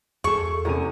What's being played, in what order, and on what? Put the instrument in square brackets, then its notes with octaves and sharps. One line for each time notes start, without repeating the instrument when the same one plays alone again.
[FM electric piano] E2 [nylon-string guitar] G#4 A4 [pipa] C#6
[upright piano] E2 C3 D#7 [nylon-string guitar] C#4 A#4